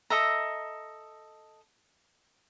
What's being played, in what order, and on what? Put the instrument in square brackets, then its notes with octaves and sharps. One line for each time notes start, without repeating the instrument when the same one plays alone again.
[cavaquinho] A4 D#5 E5 A#5